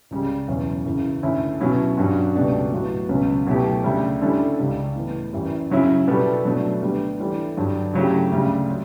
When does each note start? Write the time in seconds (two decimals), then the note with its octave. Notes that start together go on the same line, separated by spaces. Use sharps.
0.11 C#2 C#3 G3
0.48 E2 B2 F#3 C#4
0.85 F#2 C#3 E3
1.23 D2 D3 A3 C#4 E4
1.60 B2 F#3 C#4 E4
1.98 G2 F#3 C#4 F#4
2.35 C#2 B2 A3 D4 G4
2.72 A2 F#3 B3 F#4
3.09 C#2 B2 F#3 C#4
3.47 B2 F#3 A3 E4 G4
3.84 D2 C#3 G3
4.21 D3 G3 C#4 E4 A4
4.58 C#2 C#3 G3 D4
4.96 A2 E3 B3
5.33 F#2 E3 G3
5.70 C#3 F#3 C#4 E4
6.08 B2 G3 B3 E4 A4
6.45 B2 F#3 A3 D4
6.82 D2 D3 G3 B3
7.19 E3 G3 D4 A4
7.57 G2 D3 F#3
7.94 C#3 F#3 A3 E4 G4
8.32 D2 C#3 G3
8.70 F#3